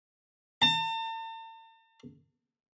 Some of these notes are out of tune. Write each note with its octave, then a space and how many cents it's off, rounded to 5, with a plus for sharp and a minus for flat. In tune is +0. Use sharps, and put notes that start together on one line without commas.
A5 +45